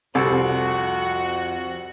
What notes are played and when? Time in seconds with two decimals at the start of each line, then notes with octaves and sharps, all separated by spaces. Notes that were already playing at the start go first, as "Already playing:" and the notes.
0.15 C2 F2 C4 F#4 A4